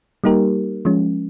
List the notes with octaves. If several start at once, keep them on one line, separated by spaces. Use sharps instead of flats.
G3 A#3 D#4 G4 A#4
F3 G#3 C#4